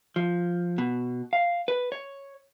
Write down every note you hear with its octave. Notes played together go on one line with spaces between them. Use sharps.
F3
B2
F5
B4
C#5